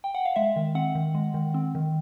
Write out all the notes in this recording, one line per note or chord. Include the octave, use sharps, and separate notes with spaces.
G5
F#5
F5
G#3 E5
D#3
C4 F#5
D#3
G#3
D#3
C4
D#3